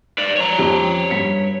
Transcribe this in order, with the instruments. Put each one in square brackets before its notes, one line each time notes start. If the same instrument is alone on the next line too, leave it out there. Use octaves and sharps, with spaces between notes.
[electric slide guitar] B4 D5
C#5 A#5
[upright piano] F2 C#4 G4
G2 B6 C#7